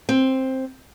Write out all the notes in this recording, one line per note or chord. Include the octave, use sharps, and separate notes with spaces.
C4